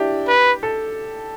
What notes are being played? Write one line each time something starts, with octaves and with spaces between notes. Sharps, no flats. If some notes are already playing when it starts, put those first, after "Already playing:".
Already playing: D4 E4 G4
B4
A4